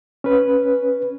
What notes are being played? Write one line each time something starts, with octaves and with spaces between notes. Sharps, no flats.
C#4 B4